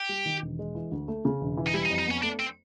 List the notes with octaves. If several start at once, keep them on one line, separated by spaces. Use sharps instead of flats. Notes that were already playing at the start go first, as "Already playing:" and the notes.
Already playing: G4
G3
D#3
E1
G#3
E3
D2
A3
C#3
E1
E3
D#4
G3 E4
D#4
F2
D#4
B3 C#4
A3 D4
C4